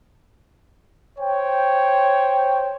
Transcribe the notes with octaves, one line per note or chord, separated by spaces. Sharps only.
C5 C#5 G5